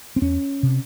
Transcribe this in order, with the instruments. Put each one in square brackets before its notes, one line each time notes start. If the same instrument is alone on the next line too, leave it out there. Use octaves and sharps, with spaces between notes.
[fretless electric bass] C4
E2 C#4
C3